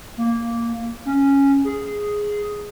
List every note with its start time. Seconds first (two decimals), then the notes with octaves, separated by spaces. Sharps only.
0.18 A#3
1.06 C#4
1.64 G#4